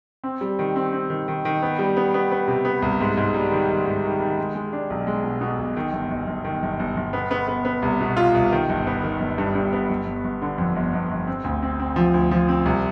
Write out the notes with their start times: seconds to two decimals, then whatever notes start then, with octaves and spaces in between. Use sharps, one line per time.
0.24 C4
0.41 G3
0.59 D#3
0.76 C4
0.93 C4
1.10 D#3
1.28 D#3
1.45 D#3
1.62 B3
1.79 G3
1.97 B3
2.14 B3
2.31 B3
2.48 C3
2.65 B3
2.82 C2
3.01 G#2
3.17 G#2
3.34 G3
3.51 D#3
3.69 D#3
3.86 G#2
4.04 D#3
4.20 D#3
4.38 G#3
4.55 G#3
4.73 D4
4.90 B1
5.07 G#3
5.24 B2
5.41 B2
5.59 B1
5.76 D#3
5.93 G1
6.10 G1
6.27 G1
6.44 D#3
6.63 G1
6.79 G1
6.97 G1
7.13 B3
7.31 B3
7.48 B3
7.65 B3
7.82 C2
8.01 B2
8.17 F4
8.34 C2
8.52 D#3
8.69 G1
8.87 B3
9.03 D#3
9.20 G1
9.38 G2
9.55 G2
9.73 B3
9.90 G1
10.06 G1
10.24 G1
10.42 D3
10.58 F2
10.76 G1
10.93 G1
11.11 G1
11.28 C4
11.44 D2
11.63 C4
11.79 C4
11.96 F3
12.14 D2
12.31 F3
12.49 C4
12.65 C2